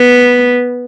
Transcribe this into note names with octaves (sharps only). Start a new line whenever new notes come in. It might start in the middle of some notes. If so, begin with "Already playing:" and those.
Already playing: B3